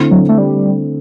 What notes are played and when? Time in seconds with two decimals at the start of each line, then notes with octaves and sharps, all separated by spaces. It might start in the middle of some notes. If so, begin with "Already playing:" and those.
Already playing: D3 A3 C4 E4
0.11 F#3
0.29 A3
0.38 G3